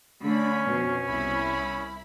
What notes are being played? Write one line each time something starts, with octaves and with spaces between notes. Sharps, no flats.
D3 A3 C#4 B5
F2 B2
C2 E4 B5